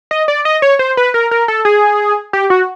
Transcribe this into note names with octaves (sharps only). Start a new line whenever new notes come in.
D#5
D5
D#5
C#5
C5
B4
A#4
A#4
A4
G#4
G4
F#4